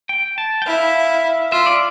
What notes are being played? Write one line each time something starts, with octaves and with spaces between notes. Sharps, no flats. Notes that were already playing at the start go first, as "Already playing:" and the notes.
G5
A5
G5
E4 F5
F4 E5
D5